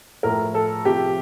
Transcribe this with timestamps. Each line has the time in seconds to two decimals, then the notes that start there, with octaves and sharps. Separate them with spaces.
0.23 A2 F3 A#4
0.54 A4
0.85 C3 F3 G4